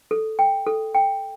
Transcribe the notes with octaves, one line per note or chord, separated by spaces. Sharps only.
A4
G5
A4
G5